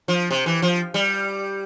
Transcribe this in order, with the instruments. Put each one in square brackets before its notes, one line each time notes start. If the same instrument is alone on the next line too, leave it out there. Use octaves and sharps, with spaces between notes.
[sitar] F3
C3
E3
F3
G3